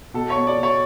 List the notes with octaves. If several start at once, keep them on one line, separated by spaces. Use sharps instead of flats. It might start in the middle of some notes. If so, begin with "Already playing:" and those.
B2 A4
C#5
B3
D5
B2
C#5